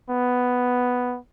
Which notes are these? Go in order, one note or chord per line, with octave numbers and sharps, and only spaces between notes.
B3